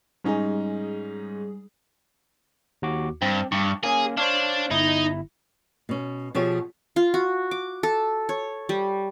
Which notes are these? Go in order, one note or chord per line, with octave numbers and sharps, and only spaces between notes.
G#2 G3 C#4 D#4 G#4
D#2 F#4 D6
G2 C4
G2 C#6
A#3 C#4 G#4
D4 C5 C#5 F5
G1 D#4 E4
B2 C#4
B2 F3 G4 G#4 C#5
F4
F#4
D6
A4
C#5
G3